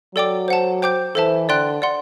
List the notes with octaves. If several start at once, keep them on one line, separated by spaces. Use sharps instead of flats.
F#3 A4 D5 G5 D6
C5 F#5 A5
C5 G5 D6 G6
E3 A4 C5 E5 A5
D3 D5 G5 C6 F#6
D5 F#5 C6